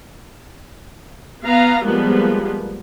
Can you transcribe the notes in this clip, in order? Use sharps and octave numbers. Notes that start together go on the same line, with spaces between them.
B3 F5 A#5
F3 G3 G#3 A#3 B3